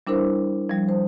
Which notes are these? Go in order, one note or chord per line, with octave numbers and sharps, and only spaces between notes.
G3 D4 E4 A#4 C5
F3 G3
C5